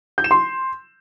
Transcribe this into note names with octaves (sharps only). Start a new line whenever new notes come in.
G6
E7
C6